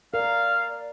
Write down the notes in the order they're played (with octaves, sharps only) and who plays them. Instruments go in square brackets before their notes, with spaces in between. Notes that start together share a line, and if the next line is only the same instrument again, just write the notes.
[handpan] A#4 [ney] D5 [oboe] F5